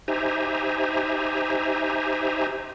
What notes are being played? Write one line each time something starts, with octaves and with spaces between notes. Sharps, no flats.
D#4 G4 C5 E5 G#5 A#5